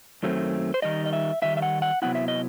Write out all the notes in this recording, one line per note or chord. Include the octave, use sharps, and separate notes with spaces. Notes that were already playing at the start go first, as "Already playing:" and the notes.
F#2 D#3 F#3 A3 C4
C5
D#3 G3 D#4 D#5
D#5
E5
D#3 G3 D#4 E5
E5
F#5
F#5
C3 F#3 B3 E4 F#5
E5
D#5